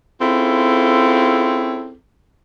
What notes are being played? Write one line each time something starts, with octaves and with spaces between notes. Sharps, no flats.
C4 C#4 E4 F4 G#4 A4